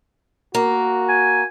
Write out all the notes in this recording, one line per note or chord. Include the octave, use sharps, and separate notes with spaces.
A#3 F#4
G#5